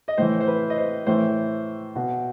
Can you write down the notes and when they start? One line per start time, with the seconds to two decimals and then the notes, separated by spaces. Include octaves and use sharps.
0.08 D#5
0.18 A2 E3 C5
0.40 C5
0.47 B4
0.70 D#5
0.78 C5
1.06 A2 E3 C5
1.96 B2